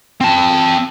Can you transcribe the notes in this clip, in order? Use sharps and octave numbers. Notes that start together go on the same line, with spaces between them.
C4 A5